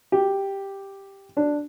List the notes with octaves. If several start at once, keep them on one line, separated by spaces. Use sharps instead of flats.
G4
D4